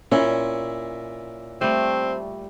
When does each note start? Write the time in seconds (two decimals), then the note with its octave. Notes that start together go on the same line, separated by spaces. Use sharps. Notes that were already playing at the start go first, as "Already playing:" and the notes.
0.12 A#2 C#4 E4 E5
1.61 G3 A3 C4